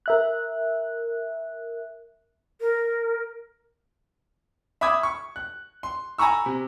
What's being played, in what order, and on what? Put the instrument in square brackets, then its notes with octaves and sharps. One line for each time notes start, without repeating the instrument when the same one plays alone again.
[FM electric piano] A#4 E5 F#6
[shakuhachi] A#4
[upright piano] E5 B5 D6 D#6 G#6
C#6
F#6
C6
G#5 A#5 B5 C#6 E6
C3